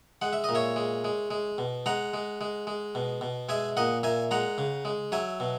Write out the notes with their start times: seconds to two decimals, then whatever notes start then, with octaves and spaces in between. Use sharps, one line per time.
0.22 G#3 F#5
0.33 E5
0.44 D#5
0.49 A#2
0.55 C#5 E5
0.76 G#3
1.04 G#3
1.31 G#3
1.58 B2
1.86 G#3 F#5 A#5
2.14 G#3
2.41 G#3
2.67 G#3
2.95 B2
3.21 B2
3.49 G#3 E5 G#5
3.77 A#2 D#5 F#5
4.03 A#2 E5 G#5
4.31 G#3 F#5 A#5
4.58 C#3
4.85 G#3
5.12 F#3 E5 G#5
5.40 B2